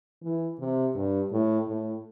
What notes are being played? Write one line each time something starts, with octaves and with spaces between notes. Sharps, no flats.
E3
C3
G2
A2
A2